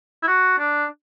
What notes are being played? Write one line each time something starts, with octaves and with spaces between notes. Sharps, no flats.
E4
F#4
D4